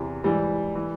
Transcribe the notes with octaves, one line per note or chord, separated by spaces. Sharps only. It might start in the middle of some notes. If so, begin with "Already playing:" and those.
Already playing: E2 C3 E3
G#2 E3 G3
E3